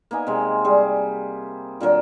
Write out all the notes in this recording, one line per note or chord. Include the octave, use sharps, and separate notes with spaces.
A#3 B3 D#4 G#5
C3 G#3
G3 G#4 C5
A#2 D3 F#3 A#4